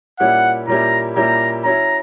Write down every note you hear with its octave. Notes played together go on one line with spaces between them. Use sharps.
A#2 G3 C#4 E4 G4 F#5
A#2 G3 C#4 E4 G4 A#5
A#2 G3 C#4 E4 G4 A#5
F#3 C#4 E4 A#5